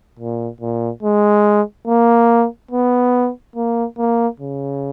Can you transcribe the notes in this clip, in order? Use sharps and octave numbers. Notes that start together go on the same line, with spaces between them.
A#2
A#2
G#3
A#3
B3
A#3
A#3
C#3